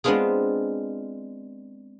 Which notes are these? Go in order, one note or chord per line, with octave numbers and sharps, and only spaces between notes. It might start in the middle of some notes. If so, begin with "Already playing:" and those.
G#3 B3 C4 D4 F4 G#4